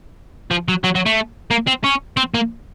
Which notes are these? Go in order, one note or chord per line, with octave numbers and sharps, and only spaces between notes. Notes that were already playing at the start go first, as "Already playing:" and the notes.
F3
F#3
F#3
F#3
A3
A#3
C4
C#4
C4
A#3